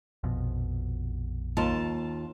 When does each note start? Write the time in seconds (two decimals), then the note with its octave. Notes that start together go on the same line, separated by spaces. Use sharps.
0.23 A#1 F2 B2
1.57 D#2 F4 A5